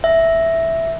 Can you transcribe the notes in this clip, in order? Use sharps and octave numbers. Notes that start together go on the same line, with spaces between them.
E5